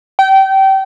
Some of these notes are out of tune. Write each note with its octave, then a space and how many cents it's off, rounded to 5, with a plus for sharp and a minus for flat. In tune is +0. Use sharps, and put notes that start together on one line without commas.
G5 -25